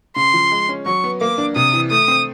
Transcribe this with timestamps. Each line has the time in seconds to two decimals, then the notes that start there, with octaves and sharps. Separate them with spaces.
0.16 C#3 C6
0.34 F3
0.52 G#3
0.69 C#4
0.86 F#3 C#6
1.04 B3
1.21 A#3 D6
1.38 D4
1.56 C3 D#6
1.73 E3
1.91 A3 D#6
2.08 C4